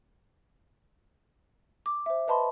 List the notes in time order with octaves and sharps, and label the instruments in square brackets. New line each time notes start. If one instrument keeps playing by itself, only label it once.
[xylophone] D6
C5 E5
B4 D#5 A5 B5 C6